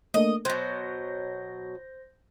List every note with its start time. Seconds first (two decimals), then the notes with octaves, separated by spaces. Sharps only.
0.14 A3 A#3 D4 D#5
0.45 B2 F#3 C5 G6 A#6